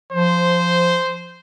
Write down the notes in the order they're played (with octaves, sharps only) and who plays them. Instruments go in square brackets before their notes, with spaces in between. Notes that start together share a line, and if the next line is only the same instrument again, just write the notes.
[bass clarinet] F3 [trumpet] C5